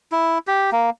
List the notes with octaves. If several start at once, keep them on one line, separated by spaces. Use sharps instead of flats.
E4
G4
A#3